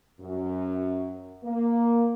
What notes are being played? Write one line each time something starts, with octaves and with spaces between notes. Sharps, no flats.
F#2
A#3